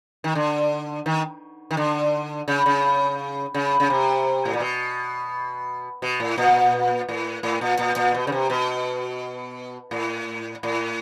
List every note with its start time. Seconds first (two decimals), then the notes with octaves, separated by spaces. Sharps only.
0.24 D#3
0.35 D3
1.06 D#3
1.71 D#3
1.77 D3
2.48 C#3
2.66 C#3
3.54 C#3
3.80 C#3
3.90 C3
4.45 A2
4.53 A#2
4.60 B2
6.02 B2
6.20 A2
6.38 A#2
7.09 A2
7.43 A2
7.61 A#2
7.79 A#2
7.96 A#2
8.15 B2
8.27 C#3
8.32 C3
8.50 B2
9.91 A2
10.63 A2